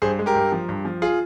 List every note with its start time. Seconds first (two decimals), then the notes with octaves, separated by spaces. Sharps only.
0.02 G2 G#4 C5
0.19 G#3
0.26 G4 A#4
0.35 G2
0.52 F3
0.69 G2
0.85 F3
1.02 F4 G#4